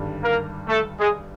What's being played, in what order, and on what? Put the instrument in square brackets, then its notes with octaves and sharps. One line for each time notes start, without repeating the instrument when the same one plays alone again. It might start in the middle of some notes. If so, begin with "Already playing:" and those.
Already playing: [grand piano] G#1 G2 D3 G3
[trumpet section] A#3 A#4
A3 A4
G#3 G#4